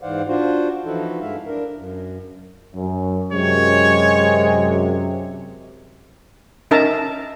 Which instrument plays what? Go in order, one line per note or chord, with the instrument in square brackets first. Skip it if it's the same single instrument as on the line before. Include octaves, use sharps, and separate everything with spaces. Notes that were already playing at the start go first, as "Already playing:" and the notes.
[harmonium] G#2 E3 C5 D5 F5 F#5
D4 F4 F#4 C5
E3 F3 D#4 E4 F#4 A4
G2 G#3 E4 E5 F5
D4 A#4
F#2
[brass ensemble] F#2
[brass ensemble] F#2 C3 [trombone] G#3 [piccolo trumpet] C#5
[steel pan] C#4 D#4 A#4 E5 A5 A#5